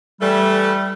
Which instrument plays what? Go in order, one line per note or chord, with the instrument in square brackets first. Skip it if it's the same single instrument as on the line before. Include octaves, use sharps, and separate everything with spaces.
[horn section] E3 A3 [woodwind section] G3